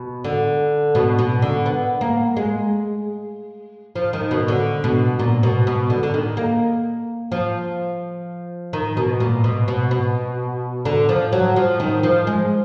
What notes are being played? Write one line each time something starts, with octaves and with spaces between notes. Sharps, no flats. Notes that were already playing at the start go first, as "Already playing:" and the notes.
Already playing: B2
D3
B2
B2
D3
B3
A#3
G#3
F3
D#3
B2
D3
B2
A#2
B2
B2
D3
D3
D#3
A#3
F3
D#3
B2
A#2
B2
B2
B2
D3
F3
F#3
F3
D#3
F3
G#3